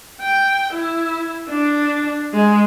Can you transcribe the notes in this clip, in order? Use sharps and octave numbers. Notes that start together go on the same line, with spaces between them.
G5
E4
D4
G#3